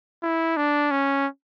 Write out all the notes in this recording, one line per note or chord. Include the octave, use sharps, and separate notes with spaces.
E4
D4
C#4